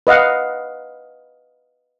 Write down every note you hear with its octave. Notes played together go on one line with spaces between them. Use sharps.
B4 D#5 F5 F#5